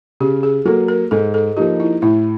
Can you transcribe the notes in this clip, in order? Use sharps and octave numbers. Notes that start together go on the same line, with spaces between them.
C#3 G4
G#4
F#3 A#3 A4
A#4
G#2 A4
A4
F3 A#3 D#4 G4
E4
A2 E4